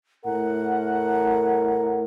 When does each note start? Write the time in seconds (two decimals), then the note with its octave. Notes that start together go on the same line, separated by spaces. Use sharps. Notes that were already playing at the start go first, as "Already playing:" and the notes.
0.25 A2 A#4 F#5